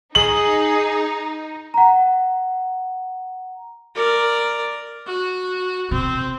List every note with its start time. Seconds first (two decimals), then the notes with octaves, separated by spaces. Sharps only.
0.15 D#4 G#4 F#7
1.74 F#5 A#5
3.95 A#4 D5
5.06 F#4
5.91 C3 C4